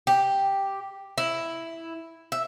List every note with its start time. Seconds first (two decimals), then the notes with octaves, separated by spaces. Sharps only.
0.07 G4
1.18 E4
2.32 E5